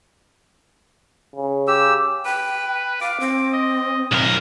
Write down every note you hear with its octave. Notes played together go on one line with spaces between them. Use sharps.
C#3
G4 E6
B4 G5
F5 D6
C4
D#5
B1 A#4